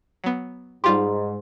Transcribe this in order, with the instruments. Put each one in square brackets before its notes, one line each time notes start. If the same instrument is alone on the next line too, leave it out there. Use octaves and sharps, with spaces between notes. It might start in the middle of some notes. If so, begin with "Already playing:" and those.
[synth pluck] F#3 B3
[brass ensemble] G#2 [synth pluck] G3 F4 G4 [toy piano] C6